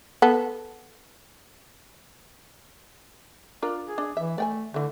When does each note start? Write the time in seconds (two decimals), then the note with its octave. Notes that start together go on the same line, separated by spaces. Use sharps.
0.22 B3 A4
3.62 D4 F4 A#4
3.85 G#4
3.98 D4
4.17 E3 E5
4.38 A3 D5 G5 G#5
4.74 D3 E3 A3